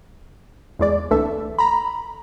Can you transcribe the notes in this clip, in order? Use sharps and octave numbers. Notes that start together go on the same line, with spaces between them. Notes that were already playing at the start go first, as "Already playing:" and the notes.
E2 G#3 D5
C2 D3 E3 A3 A4 E5
A#5 B5